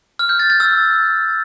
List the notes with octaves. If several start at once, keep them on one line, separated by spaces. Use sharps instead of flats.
F6
G6
A6
A6
E6